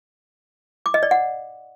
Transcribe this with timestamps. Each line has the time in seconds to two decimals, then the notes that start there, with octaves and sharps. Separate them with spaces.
0.86 D6
0.94 D#5
1.03 D5
1.11 F#5